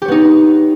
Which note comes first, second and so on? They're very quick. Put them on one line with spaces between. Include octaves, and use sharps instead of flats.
G4 C#5 B3 D#4